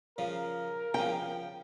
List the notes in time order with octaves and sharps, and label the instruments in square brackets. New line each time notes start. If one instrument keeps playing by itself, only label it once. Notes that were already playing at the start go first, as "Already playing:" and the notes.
[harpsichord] C#3 F3 [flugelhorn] A#4
[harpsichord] C#3 F3 [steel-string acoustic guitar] G5